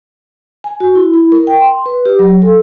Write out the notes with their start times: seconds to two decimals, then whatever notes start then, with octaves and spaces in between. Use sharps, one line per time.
0.64 G#5
0.80 F#4
0.95 E4
1.13 E4
1.32 A#4
1.47 G5
1.61 C6
1.86 B4
2.05 G4
2.19 F#3
2.42 A4